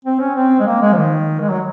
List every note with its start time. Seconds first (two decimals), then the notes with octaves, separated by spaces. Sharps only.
0.05 C4
0.20 C#4
0.35 C4
0.60 G#3
0.66 A#3
0.82 G#3
0.92 F3
0.97 D#3
1.40 G#3
1.49 F#3